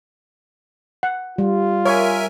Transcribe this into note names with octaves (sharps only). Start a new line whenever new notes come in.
F#5
G3 F4
A#4 C#5 E5 G#5